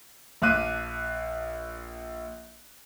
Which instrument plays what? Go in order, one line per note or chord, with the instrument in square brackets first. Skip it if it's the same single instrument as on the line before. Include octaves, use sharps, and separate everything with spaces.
[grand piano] A#1 E5 F5 D6 F#6 D#7